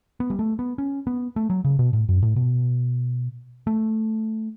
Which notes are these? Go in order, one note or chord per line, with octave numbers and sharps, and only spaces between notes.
B3
G3
A3
B3
C#4
B3
A3
F#3
C#3
B2
A2
F#2
A2
B2
A3